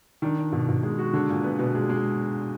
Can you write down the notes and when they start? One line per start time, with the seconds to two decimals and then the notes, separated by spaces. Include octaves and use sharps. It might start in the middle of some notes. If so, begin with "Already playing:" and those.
0.22 D#3 D4
0.38 D4
0.52 B2
0.68 B2
0.83 G#3
0.98 F#4
1.13 D3 G#3
1.29 A#2
1.44 B3
1.59 B2 B3
1.75 G#3
1.89 G#3